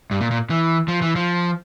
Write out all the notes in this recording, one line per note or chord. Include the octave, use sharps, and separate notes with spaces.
G2
A#2
A#2
E3
F3
E3
F3